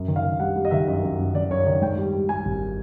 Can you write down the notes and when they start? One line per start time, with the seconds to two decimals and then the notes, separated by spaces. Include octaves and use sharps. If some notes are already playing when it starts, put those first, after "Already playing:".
Already playing: F#2
0.08 D#3
0.16 F5
0.24 D#3
0.40 G3 F#5
0.56 G3
0.65 D#5
0.71 D#3 E5
0.88 F#2 D#5
1.03 F#2
1.19 F#2
1.35 D#3 D5
1.50 F#2 C#5
1.66 D#3 D5
1.82 G#2 G5
1.98 G3
2.13 G3
2.29 G3 G#5
2.45 G#1